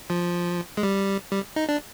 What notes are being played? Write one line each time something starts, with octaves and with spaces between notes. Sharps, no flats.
F3
G#3
G3
G3
D#4
D4